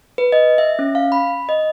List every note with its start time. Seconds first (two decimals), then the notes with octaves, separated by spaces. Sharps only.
0.18 B4
0.32 D#5
0.58 E5
0.79 C#4
0.95 F5
1.12 B5
1.49 D#5